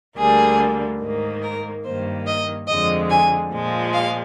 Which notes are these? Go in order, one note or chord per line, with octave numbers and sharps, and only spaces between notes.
D2 D3 G3 A#3 G#4
G#2 D#3 A#3
A#4
G2 D#3 A#3 C5
D#5
F2 D3 G#3 D#5
G#5
A#2 F3 G#3
F5